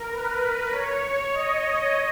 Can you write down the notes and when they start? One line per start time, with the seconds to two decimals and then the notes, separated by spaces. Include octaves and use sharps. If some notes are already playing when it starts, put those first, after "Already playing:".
Already playing: A#4
0.11 B4
0.71 C#5
1.32 D#5